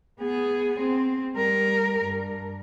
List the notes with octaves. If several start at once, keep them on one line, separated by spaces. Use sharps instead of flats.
B3 G#4
C4
G3 A#4
G2